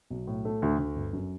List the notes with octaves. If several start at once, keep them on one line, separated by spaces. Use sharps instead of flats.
B1
A2
A3
D2
D2
G1
F#2